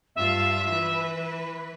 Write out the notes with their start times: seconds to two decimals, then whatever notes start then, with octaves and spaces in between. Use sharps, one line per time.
0.16 G2 F4 E5 F5
0.70 E3 B4